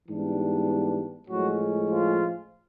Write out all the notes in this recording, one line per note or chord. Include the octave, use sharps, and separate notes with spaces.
G#2 E3 G3 B3 D4
A2 F3 F#3 G#3 C#4 F#4
F3 F4